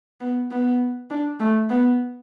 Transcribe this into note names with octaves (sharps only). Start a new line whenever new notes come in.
B3
B3
D4
A3
B3